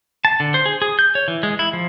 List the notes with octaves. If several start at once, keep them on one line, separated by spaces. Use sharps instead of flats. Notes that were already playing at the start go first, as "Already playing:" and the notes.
A5
D3
C5
G#4
G#4
G6
C#5
E3
G#3
E4
F3